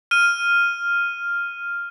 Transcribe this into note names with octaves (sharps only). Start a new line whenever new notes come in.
F6 D#7